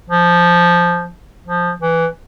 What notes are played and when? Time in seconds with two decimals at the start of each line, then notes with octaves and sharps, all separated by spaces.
0.09 F3
1.47 F3
1.82 E3